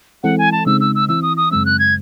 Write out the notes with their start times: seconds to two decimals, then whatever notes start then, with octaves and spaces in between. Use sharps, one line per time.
0.23 E3 G#3 C4 E4 A4 F#5
0.38 G#5
0.52 A5
0.66 C#3 G#3 C4 D#4 E6
0.81 E6
0.95 E6
1.09 E3 C4 E4 E6
1.22 D#6
1.37 D#6
1.51 F#2 C#3 G#3 C4 E6
1.66 F#6
1.79 G#6